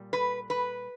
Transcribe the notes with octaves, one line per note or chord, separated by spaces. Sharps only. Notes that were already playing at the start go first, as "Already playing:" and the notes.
Already playing: A#2 G3
B4
B4